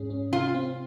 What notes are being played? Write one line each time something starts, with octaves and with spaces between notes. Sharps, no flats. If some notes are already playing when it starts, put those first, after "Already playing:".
Already playing: G#2 C#4 G#4
C#4
C3 F4
C4